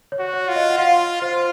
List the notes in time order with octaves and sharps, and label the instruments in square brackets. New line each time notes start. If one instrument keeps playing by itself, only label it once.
[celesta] C#5
[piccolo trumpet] F#4
[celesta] C#5
[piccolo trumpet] F4
[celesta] D#5
F#5
[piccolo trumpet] F4 [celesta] F5
[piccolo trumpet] F4 [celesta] C5